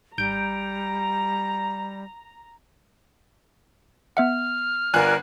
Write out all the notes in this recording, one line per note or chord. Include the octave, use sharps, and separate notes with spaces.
G#1 G3 A#5 G6 D7
B3 E5 F#5 F6
G1 F4 A#4 D5 G#5 F#6